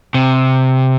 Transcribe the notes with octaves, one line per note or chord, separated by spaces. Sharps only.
C3